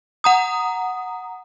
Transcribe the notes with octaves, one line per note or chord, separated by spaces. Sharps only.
F#5 A#5 D#6